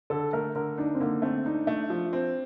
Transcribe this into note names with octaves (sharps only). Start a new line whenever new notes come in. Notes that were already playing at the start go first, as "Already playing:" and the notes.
D3 A4
A3 A#4
D3 A#4
D4 D#4
C4
D3 A#3
A3 C4
D4 D#4
A3
F3
C4